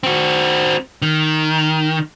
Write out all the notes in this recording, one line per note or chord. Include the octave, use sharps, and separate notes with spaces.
C4 F#4
D#3